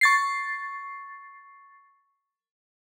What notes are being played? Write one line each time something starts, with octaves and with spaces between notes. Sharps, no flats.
C#6 A6 C7